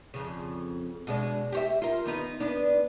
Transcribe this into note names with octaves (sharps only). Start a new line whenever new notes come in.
F2 C#3
B2 G#3 D4
G4 C#5 E5
F4 A#4
D#3 B3 D#4
B3 D4